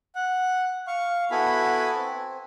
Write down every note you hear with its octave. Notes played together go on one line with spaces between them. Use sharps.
F#5
F5 C#6
B3 E4 F#4 A4 G#5 B5
C4